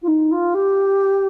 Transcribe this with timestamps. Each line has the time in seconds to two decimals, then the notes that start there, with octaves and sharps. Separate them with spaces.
0.02 F4
0.07 D#4
0.31 F4
0.54 G4